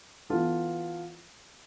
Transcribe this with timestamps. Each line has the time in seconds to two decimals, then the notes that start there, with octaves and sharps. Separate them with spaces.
0.30 E3 B3 F4 A4